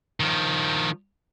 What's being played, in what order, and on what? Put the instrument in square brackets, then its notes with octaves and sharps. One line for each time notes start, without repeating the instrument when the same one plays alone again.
[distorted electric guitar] D#3 F3